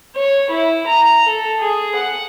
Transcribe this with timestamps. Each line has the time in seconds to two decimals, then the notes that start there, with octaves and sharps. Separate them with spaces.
0.16 C#5
0.50 E4
0.87 A#5
1.26 A4
1.60 G#4
1.95 F#5